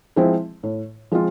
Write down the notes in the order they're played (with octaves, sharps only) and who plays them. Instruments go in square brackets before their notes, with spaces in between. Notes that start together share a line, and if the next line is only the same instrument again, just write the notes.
[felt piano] F3 G#3 C4 E4
A2
F3 G#3 C4 F4